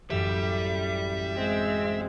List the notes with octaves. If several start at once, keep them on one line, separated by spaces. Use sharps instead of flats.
A1 F#2 G3 E5
G#3 C4